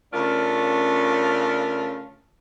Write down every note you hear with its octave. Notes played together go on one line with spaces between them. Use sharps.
C#3 A3 C#4 D4 F4 A#4